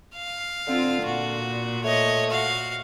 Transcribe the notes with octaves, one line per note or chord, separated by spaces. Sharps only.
F5
D3 C4 F4
A#2 F#4
A3 C#5 D#5
F#4 F5